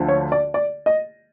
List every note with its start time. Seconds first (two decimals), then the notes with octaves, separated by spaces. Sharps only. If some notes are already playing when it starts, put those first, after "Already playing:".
Already playing: D2 D3 F3
0.08 C#5
0.32 D5
0.54 D5
0.86 D#5